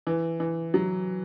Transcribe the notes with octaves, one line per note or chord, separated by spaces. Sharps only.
E3
E3
F#3